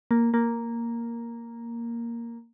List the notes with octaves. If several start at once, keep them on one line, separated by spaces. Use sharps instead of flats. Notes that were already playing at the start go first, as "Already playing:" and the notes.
A#3
A#3